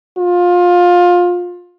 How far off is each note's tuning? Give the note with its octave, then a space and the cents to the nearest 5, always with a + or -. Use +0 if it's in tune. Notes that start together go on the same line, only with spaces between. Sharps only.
F4 +20